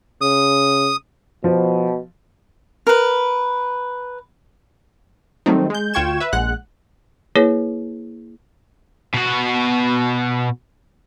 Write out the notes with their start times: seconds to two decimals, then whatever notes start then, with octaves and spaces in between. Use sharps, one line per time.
0.21 C#3 D#6
1.44 B2 F3
2.87 A#4 B4
5.46 D#3 F#3 G3 A3 C4 D#4
5.70 G#3 G6
5.94 D2 F4 G5 C#6 G#6 E7
6.20 B4 E5
6.33 A#1 G#3 F#5 F#6
7.36 A#3 E4 G#4 B4 C#5
9.14 B2 F#4